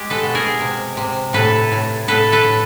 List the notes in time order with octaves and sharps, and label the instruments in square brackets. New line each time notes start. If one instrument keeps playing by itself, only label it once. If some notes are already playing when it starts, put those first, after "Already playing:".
Already playing: [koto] G#3 G4
A4 B4
B2
G#4 A#4
C3
C3
A2 A4 B4
A2
A2 A4 B4
A4 B4
A2